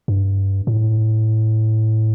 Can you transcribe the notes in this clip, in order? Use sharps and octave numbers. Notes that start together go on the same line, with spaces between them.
G2
A2